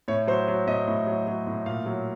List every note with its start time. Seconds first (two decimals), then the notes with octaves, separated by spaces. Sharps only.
0.08 A2 C#5
0.27 F#3 C5
0.48 F#3
0.67 A2 D#5
0.87 A2
1.07 F#3
1.27 F#3
1.47 A2
1.66 A#2 F5
1.86 F#3